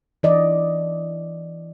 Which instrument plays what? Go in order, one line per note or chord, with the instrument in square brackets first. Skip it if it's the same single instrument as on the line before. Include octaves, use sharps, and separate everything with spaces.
[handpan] E3 D5 D#5